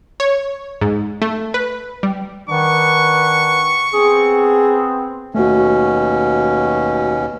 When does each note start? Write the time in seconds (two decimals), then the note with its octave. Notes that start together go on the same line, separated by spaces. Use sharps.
0.20 C#5
0.81 G#2
1.22 A3
1.54 B4
2.03 G3
2.49 D#3 D4 B4 F#5 C#6
3.94 B3 C4 G#4
5.35 D#2 B2 A3 C#4 F#4